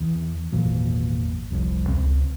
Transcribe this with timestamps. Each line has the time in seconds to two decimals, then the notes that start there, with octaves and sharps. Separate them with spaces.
0.01 E2
0.52 G#1 E2 A#2 F#3
1.51 F1 C2 F2
1.88 C#2 C4